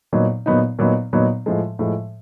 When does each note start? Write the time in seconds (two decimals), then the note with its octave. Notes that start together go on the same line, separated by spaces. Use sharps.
0.13 A#2 F#3 B3 D#4
0.46 A#2 F#3 B3 D#4
0.79 A#2 F#3 B3 D#4
1.13 A#2 F#3 B3 D#4
1.46 A2 F3 G#3
1.79 A2 F3 G#3